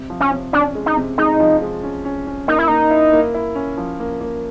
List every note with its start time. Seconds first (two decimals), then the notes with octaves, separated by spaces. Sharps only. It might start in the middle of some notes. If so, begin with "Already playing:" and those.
Already playing: C3
0.10 F3
0.21 C#4
0.31 C3
0.53 C#4 D4
0.75 G#3
0.86 D#4
0.97 C3
1.18 G#3 D#4
1.40 F3
1.62 G#3
1.83 C#4
2.05 C#4
2.27 C#4
2.47 A#3 D#4
2.59 E4
2.68 A#3 D#4
2.90 E4
3.13 A#3
3.34 E4
3.55 C#4
3.78 F3
4.00 A#3
4.21 A#3